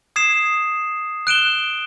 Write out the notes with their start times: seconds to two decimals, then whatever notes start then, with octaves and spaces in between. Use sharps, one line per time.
0.16 D#6 G#6 C7 E7
1.27 F#6 D7 E7 G7